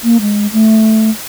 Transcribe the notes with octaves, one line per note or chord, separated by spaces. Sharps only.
A#3
G#3
A3